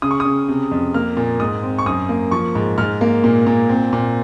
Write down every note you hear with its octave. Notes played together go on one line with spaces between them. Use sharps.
C#3 D#6
C#6
D#6
C#3
C3
F2
A#3 F6
A#2
G#2 D#6
C4
C#6
F#2 D#6
A#3
F3 C#6
G#2
G#2 F6
A#3
A#2
A#2
C4
A#2